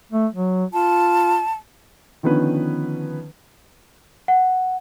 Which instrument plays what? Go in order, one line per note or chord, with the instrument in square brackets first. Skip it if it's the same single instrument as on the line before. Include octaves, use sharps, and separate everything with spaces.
[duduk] A3
F#3
[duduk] F4 [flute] A5
[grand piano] D3 D#3 F3 B3 C#4 B4
[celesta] F#5